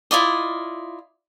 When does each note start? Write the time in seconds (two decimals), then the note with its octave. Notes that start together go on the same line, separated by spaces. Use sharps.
0.11 E4 F4 D5 D#5